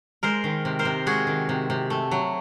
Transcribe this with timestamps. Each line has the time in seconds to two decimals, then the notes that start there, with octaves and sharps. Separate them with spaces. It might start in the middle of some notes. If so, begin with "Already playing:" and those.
0.23 G#3 A#4 C5
0.44 D#3
0.65 C3
0.79 A#4 C5
0.85 C3
1.06 G#3 F#4 G#4
1.27 D#3
1.49 C3
1.70 C3
1.90 A3
2.11 F#3